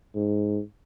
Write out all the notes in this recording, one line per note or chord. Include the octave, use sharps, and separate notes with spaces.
G#2